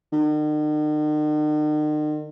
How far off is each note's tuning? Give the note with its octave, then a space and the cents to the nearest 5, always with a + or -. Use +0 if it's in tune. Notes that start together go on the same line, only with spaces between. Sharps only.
D#3 -45